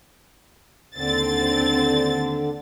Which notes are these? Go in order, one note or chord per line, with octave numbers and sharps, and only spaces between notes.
D#2 D3 C4 A6